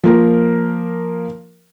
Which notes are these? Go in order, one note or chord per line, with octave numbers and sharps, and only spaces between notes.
F3 A#3 A#4